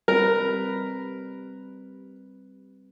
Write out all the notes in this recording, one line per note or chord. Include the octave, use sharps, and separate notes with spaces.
G3 C4 A#4 B4